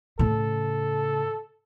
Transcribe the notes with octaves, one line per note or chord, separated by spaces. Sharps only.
A2 C#3 A4